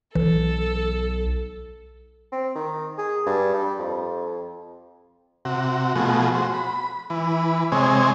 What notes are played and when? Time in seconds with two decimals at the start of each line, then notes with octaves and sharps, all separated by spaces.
0.15 B1 E3 A4
2.32 C4
2.55 D#3
2.98 G#4
3.26 G2
3.54 G3
3.79 F2
5.45 C3 F#4
5.95 B2 F3 A3 F#4 G#4
6.35 F#4 C5
6.54 B5
7.10 E3 B4
7.72 C3 G#3 C4 C#5 D#5 G#5